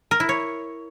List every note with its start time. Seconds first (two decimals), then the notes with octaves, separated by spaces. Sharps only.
0.11 A#4
0.20 E4
0.29 C#5